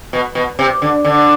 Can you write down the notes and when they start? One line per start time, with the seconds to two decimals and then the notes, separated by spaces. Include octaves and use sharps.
0.13 B2
0.35 B2
0.59 C3
0.82 D3
1.05 D3